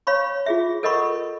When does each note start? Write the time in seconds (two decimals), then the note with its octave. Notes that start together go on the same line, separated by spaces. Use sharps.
0.07 C#5 F5 B5 C#6
0.46 F4 G#4 E5
0.83 A4 A#4 D#5 F#5 B5 C#6